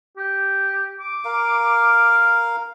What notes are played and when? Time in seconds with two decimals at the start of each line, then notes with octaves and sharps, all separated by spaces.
0.17 G4
1.00 D6
1.25 A#4 F5